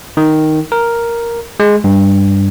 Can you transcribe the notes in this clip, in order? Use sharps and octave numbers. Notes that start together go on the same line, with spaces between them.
D#3
A#4
G#3
G2